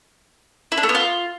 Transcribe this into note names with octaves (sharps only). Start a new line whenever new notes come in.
E4
D4
A3
B3
F4